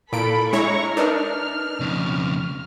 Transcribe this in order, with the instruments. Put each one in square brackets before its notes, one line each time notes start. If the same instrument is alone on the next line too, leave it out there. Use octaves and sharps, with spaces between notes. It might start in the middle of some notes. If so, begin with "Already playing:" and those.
[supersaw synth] A#2 D7 [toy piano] E4 F5 [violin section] A4 B5
[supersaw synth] G#3 E4 C#5 [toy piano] D4 [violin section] A#5 C#6
[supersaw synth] D4 D#4 [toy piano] A#4 B4 E5 [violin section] F6
[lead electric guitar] F2 C#3